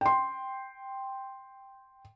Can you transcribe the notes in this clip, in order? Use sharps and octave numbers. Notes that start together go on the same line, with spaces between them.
G5 C6